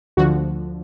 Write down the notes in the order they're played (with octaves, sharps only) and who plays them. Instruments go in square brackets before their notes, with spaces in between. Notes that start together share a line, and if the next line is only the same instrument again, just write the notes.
[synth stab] D2 D3 F3 F#4